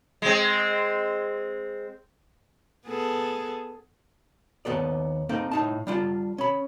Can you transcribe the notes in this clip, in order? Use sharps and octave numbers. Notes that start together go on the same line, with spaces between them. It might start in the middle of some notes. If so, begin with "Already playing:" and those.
G#3 C4
B3 G#4 A4
D#2 B3 A4 D5
A#3 C4 D#4 A4
A2 D#4 A5
G3 D4 F4
C#4 B5